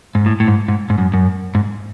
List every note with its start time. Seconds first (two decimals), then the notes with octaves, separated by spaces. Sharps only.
0.15 G#2
0.26 A2
0.40 A2
0.48 G#2
0.68 G#2
0.90 G#2
0.98 F#2
1.14 F#2
1.55 G#2